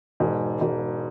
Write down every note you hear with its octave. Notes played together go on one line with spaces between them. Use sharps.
E1 G#2 G#3
E1